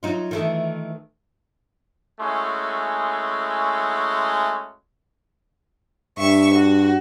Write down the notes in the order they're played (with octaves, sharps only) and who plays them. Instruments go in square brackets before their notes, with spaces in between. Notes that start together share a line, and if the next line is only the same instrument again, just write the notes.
[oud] F#3 D#4 F4
D#3 E3 A3
[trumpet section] G#3 A3 C#4 E4 F#4 C6
[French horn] G2 [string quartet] E5 C#6
[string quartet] F#4